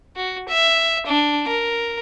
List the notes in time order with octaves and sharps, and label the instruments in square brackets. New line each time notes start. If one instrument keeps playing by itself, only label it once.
[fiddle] F#4
E5
D4
A#4